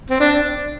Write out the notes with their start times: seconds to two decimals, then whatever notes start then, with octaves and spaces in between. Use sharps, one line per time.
0.10 C4
0.20 D4